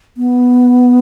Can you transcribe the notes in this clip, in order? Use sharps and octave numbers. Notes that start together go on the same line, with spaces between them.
B3